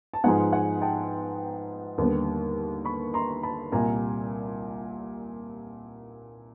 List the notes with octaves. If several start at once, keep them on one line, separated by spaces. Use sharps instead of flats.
A5
G#2 F3 G#3 B3 D#4 F#5 G#5
F#5 G#5
G5 A5
D#2 D3 G3 B3
B5 C#6
A#5 C6
A5 B5
C2 A#2 G3 G#5 A#5